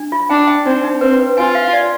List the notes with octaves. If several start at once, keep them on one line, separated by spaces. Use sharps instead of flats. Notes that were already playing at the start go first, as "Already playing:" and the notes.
Already playing: D4
F4
D4 G5
G5
C4 D#4
D#4
C4 B4
B4
F4 G#5
F5
D5